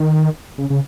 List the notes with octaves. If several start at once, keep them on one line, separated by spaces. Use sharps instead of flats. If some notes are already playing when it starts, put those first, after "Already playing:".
Already playing: D#3
C#3
C#3